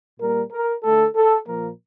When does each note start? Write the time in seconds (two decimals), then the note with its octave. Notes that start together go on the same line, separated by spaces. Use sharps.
0.19 A#2 G3 A#3 A#4
0.51 A#4
0.84 D3 A3 A4
1.15 A4
1.47 A#2 F3 A#3 A#4